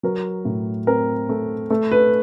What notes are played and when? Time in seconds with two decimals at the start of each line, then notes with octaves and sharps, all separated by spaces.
0.03 F#3 A#4
0.45 A2
0.87 C4 A#4
1.29 A3
1.70 A3
1.92 B4